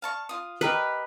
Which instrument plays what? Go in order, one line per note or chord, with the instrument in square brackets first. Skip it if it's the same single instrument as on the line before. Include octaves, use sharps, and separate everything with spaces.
[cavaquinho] F5 A5 C#6
F4 D#6
[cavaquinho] G4 A#4 D#5 [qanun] B4